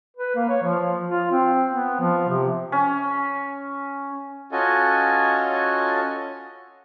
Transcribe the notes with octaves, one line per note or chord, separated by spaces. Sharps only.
B4
A#3
C#5
F3
F4
C4
B3
F3
C3
C#4
C#4 F4 F#4 A4 D#5 G#5